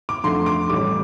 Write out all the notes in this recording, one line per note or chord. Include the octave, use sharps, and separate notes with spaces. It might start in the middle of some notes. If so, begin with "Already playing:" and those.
D6
F2 D3 A3 C6
D6
A1 A2 G3 D6